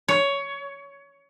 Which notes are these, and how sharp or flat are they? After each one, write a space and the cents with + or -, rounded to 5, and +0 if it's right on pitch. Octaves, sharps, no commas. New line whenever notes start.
C#5 +15